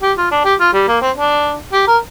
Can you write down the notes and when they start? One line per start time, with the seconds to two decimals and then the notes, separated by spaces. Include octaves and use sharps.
0.02 G4
0.18 F4
0.31 D4
0.45 G4
0.60 F4
0.73 G3
0.88 A#3
1.01 C4
1.16 D4
1.73 G4
1.87 A#4